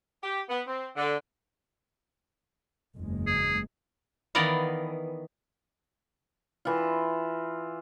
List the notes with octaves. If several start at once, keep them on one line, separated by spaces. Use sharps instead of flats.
G4
B3
C4
D3
F#1 E2 G#3
G#4
D#3 E3 B3 D5 D#5 F5
E3 F4